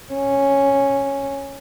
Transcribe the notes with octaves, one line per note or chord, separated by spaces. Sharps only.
C#4